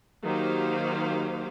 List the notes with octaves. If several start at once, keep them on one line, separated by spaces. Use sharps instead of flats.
D#3 F#3 A#3 G4 C5 F5